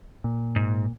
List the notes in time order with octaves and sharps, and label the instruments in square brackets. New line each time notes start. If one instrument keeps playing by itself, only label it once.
[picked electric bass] A#2
[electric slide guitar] G#2